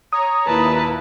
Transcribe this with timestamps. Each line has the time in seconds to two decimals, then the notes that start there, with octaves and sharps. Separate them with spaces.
0.13 C#5 A#5 D#6
0.47 D#2 A#2 E4 B4 A5